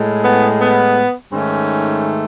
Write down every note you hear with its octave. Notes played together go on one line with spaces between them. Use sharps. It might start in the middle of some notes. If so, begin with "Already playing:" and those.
Already playing: A2 G#3
B3
B3
G#2 D#3 A3 C#4